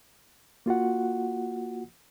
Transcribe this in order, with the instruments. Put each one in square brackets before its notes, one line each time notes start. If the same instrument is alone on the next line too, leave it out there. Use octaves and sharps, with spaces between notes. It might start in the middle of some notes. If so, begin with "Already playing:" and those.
[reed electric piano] A#3 F4 F#4 F#5